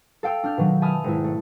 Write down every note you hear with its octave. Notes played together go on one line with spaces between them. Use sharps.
A4 F5 G5 E6
D4 F6 G6
B2 D#3 F#3
E5 G#5 A5 B5 D#6 F6
G#1 E4
A3